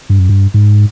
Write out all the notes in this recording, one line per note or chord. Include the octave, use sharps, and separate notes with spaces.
G2
F#2
G2
G#2